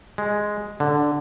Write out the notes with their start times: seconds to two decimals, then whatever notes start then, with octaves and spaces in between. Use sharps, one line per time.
0.18 G#3
0.80 D3